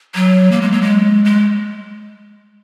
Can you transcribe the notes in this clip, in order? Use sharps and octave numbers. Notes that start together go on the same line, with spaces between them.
F#3
A#3
G#3
F#3
G#3
G#3